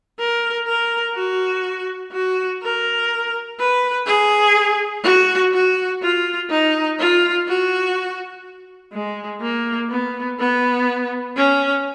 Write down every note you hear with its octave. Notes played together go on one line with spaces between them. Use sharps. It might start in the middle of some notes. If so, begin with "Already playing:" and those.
A#4
A#4
F#4
F#4
A#4
B4
G#4
F#4
F#4
F4
D#4
F4
F#4
G#3
A#3
B3
B3
C#4